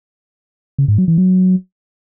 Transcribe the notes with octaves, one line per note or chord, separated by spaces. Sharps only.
C#3
G#2
F#3
E3
F#3